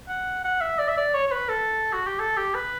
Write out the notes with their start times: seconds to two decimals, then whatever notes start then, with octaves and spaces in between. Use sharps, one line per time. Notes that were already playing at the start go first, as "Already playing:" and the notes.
0.08 F#5
0.44 F#5
0.61 E5
0.79 D5
0.88 E5
0.97 D5
1.14 C#5
1.27 C#5
1.31 B4
1.49 A4
1.93 F#4
2.07 G4
2.19 A4
2.37 G4
2.54 B4